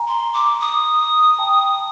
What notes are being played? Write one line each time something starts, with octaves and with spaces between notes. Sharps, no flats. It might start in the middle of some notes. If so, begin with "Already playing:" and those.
Already playing: G#5 A#5
C6
D6
D#6
G5 A5